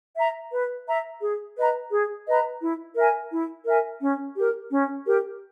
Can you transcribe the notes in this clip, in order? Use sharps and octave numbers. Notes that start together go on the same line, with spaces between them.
E5 A#5
B4
E5 A#5
G#4
B4 D#5 A#5
G#4
B4 D#5 A#5
E4
A#4 E5 G#5
E4
A#4 E5 G#5
C#4
G4 A#4
C#4
G4 A#4